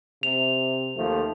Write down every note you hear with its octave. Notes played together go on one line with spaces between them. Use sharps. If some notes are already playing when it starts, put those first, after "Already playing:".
C3 F7
D#2 F3 A3